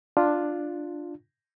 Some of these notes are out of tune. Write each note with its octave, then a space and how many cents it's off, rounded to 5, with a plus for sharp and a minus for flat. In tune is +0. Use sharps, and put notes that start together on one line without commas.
D4 +10 F4 +0